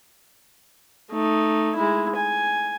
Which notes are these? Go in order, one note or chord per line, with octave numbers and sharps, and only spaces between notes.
A3 D#4
G#3 E4
G#5